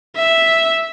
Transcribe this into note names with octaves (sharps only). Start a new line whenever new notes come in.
E5